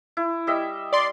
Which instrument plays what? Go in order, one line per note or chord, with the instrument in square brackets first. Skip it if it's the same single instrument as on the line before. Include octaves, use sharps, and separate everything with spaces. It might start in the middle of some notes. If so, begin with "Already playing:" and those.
[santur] E4
G3 D#5 E5
[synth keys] D5 C6